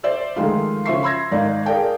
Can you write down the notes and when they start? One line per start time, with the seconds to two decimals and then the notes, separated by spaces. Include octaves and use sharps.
0.03 C5 D5 E5
0.36 D#3 F3 G#3 A3 F4
0.86 C#3 F3 C5 E5 C#6 C7
1.03 B5 C6 E6 G#6 A#6
1.31 G#1 D#4 D5 F5
1.65 G#4 A#4 D5 F5 G5 A5